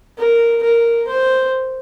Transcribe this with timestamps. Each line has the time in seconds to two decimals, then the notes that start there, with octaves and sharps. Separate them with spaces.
0.18 A#4
0.63 A#4
1.08 C5